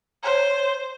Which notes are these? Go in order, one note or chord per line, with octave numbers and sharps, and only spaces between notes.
C5 C#5